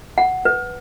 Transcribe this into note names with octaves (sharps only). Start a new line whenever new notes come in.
F#5
B4